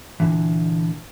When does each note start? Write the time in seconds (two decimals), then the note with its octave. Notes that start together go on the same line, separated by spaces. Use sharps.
0.20 A#2 D3 E3